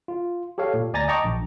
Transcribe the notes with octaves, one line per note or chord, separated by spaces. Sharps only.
F4
G4 A4 C#5 F5
A#2
D2 D5 G#5 A#5 A6 A#6
D#5 G5 A5 A#5 C#6 D6
A#1